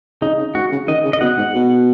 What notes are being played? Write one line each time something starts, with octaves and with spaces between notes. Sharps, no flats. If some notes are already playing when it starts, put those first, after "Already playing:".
C#3 D#4
C#3
G#2 F#4
C#3
D#3 D#5
C#3
D#5
B2 F#5
G#2
B2